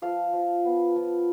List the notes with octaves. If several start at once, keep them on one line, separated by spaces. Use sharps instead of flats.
F3 F5 A5
F3
B3
F3